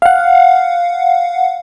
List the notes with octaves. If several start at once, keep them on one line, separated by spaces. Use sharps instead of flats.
F5 F#5